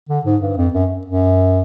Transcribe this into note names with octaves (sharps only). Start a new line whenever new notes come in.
D3
G#2
G2
F2
F#2
F#2